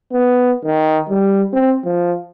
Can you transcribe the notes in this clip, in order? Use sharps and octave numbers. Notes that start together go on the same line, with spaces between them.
B3
D#3
G3
C4
F3